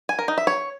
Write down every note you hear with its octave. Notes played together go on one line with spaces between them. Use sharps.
G#5
A#4
D#4
E5
C#5